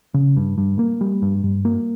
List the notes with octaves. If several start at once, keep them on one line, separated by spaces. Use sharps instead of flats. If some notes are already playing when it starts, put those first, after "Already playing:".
C#3
G2
G2
A#3
G3
G2
G2
A#3